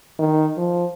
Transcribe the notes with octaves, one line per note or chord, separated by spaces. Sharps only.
D#3
F3